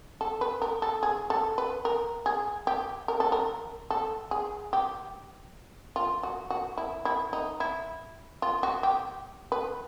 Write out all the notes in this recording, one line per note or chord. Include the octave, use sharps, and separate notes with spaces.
A4
B4
A#4
A4
G#4
A4
B4
A#4
G#4
G4
A#4
A4
A#4
A4
G#4
G4
F4
F#4
F#4
E4
E4
D#4
E4
F4
F#4
G4
B4